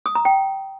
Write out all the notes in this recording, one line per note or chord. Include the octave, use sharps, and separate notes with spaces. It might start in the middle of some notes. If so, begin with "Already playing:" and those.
D#6
A#5
G5